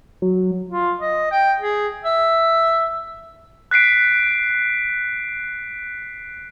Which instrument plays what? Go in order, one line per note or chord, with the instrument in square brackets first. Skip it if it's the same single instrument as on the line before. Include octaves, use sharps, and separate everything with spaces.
[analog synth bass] F#3
[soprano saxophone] F4
D#5
G5
G#4
E5
[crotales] F#6 B6 C7 D7